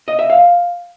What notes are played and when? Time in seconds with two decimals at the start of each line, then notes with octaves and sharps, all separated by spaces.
0.08 D#5
0.19 E5
0.30 F5